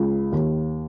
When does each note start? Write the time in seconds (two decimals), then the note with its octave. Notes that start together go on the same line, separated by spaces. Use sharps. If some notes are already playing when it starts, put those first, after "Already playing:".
Already playing: C#2
0.32 D#2